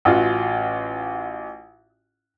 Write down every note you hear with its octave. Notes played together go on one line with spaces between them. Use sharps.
A1 F4 F#4